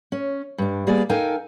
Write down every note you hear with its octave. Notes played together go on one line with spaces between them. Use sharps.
C#4
G2 D4
G3 A#3 B3 G#4 D5
D#4 A4 A#4 F5 G5 G#5